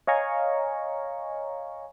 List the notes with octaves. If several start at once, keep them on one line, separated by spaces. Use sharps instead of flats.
C#5 D#5 F5 G#5 A#5 C#6